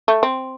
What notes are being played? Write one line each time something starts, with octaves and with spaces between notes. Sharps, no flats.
A3
C4